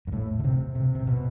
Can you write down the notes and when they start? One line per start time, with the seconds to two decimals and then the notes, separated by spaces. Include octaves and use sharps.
0.07 G2
0.12 A2
0.40 D3
0.44 C3
0.75 C3
0.95 C3
1.07 B2